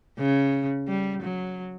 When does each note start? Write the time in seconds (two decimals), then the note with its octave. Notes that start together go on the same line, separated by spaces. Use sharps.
0.18 C#3
0.88 G3
1.23 F#3